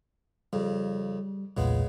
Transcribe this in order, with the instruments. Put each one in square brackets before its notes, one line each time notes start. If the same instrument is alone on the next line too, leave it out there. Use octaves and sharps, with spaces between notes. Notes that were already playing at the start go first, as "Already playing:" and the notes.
[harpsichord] F2 C#3 [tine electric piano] G3
[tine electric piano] B1 E2 A#2 [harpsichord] C#3 G#3 B3